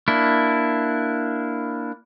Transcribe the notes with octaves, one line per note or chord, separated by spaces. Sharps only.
A#3 D4 E4